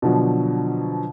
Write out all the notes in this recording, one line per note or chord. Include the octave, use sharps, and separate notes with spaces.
B2 D3 F3 F#3